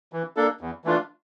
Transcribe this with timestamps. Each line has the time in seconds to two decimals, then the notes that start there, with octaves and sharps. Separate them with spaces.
0.13 E3
0.36 A#3 D4 A4
0.61 E2
0.84 E3 A3 D4 F4